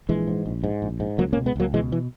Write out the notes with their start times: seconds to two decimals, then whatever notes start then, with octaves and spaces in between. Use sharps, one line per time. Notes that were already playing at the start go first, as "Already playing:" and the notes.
0.09 A#1 E3 G#3
0.28 G#2
0.46 A#1
0.64 G#2
0.82 A#1
1.00 G#2
1.18 C#2 F#3 A#3
1.33 A#3 C#4
1.37 B2
1.46 G#3 B3
1.56 C#2 F#3 A#3
1.74 B2 E3 G#3
1.92 E3